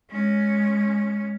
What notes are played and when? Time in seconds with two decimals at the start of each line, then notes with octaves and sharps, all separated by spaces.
0.10 G#3 C#4